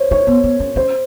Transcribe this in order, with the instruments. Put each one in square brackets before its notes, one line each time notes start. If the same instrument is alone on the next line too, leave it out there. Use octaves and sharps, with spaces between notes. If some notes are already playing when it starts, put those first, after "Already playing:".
Already playing: [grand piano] C5 C#5
[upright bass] D#4 [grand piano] C#5
[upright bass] B3
B3
C#4
[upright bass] C#4 [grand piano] C5